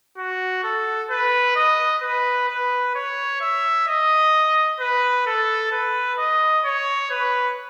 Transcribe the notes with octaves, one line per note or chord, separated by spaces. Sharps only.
F#4
A4
B4
D#5
B4
B4
C#5
E5
D#5
B4
A4
B4
D#5
C#5
B4